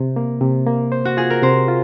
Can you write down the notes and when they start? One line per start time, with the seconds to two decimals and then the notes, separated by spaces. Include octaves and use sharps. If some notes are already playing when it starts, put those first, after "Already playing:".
Already playing: C3
0.16 A#3
0.41 C3
0.66 A#3
0.92 C5
1.05 F#4
1.17 F4 G#4
1.30 A#4
1.42 C3 C5
1.68 F4